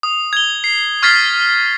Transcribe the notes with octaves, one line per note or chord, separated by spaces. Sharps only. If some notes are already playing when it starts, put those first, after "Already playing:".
D#6
G#6 G7
C7
C#6 F6 G#6 A6 B6 C7